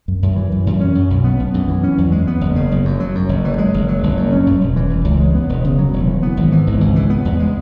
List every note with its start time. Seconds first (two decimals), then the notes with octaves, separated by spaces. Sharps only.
0.08 F#2
0.23 F#2
0.36 E3
0.52 F#2
0.67 F#2
0.80 C#4
0.95 F#2
1.10 B1
1.24 B3
1.40 B1
1.54 F#2
1.68 E3
1.84 C#4
1.98 E2
2.12 G#3
2.27 B3
2.41 F#1
2.56 C#3
2.71 F#1
2.85 F#2
3.00 F#3
3.15 F#2
3.29 F#1
3.45 E3
3.58 G#3
3.74 F#1
3.88 F#3
4.03 F#1
4.17 F#2
4.32 C#4
4.47 F#2
4.61 E1
4.76 E3
4.90 E1
5.05 C#2
5.20 G#3
5.35 B3
5.49 E1
5.64 C#3
5.78 F#3
5.93 E1
6.07 E3
6.23 B3
6.37 G#1
6.52 E3
6.67 G#1
6.81 C#2
6.96 E3
7.10 B3
7.25 E2
7.40 G#3